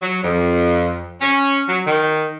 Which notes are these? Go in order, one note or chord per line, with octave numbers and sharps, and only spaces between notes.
F#3
F2
C#4
F#3
D#3